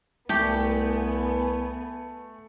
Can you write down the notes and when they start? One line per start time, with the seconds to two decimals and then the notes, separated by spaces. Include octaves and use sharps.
0.29 C2 A3 B3 G4 G#5